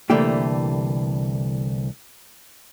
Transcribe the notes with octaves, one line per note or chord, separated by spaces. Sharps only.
C2 D3 E3 A3 A#3 G4